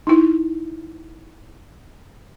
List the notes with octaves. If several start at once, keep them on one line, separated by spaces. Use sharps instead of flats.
D#4 E4